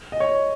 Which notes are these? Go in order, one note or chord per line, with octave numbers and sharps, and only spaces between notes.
D#5
C#5